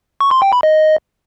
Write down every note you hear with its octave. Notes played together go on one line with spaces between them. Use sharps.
C#6
C6
G5
B5
D#5